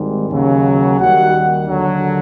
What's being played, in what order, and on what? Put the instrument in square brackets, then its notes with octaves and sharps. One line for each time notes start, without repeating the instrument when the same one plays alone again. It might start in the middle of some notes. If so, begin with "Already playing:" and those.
Already playing: [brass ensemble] G#1 G#2 D#3 G3
D#2 C#3 F#3
D#2 D#3 G3 F#4 F#5
D#2 D3 F#3